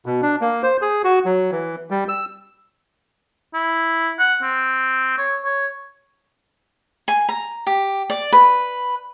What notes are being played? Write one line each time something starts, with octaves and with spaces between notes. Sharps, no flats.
B2
D4
A#3
C5
G#4
F#4
F#3
E3
G3
E6
E4
F#5
C4
C#5
C#5
G#5
A#5
G4
D5
B4